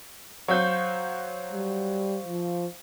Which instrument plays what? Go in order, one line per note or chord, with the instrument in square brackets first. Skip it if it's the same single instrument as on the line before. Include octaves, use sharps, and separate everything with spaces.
[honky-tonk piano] F#3 G6 [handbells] C5 F5 C#6
[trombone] G3
F3